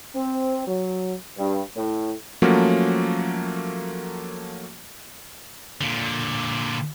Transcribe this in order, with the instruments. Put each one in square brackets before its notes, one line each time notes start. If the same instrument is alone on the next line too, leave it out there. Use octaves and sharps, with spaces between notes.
[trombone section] C4
F#3
G2
A2
[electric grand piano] F3 F#3 A3 A#3 C#4 F#4
[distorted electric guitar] A#2 D3